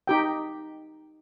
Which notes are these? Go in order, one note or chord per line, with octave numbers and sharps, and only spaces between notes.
D#4 G4 G5